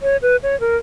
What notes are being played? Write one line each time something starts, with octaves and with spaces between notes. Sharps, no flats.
C#5
B4
C#5
A#4